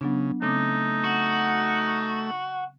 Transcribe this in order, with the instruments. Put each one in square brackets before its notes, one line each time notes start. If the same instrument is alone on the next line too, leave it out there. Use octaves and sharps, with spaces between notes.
[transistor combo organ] C#3 [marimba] F#3 B3 D4
[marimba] C#3 C4 D6 [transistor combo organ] A3 [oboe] D#4
[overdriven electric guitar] F#4